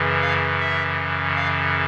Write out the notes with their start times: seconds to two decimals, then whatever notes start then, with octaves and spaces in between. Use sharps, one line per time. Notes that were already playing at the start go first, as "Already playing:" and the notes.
Already playing: F#2 C#3 E3
0.22 F5
0.60 E5
1.36 F5